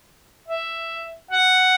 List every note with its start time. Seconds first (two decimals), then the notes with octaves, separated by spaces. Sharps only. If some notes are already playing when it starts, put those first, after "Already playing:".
0.49 E5
1.31 F#5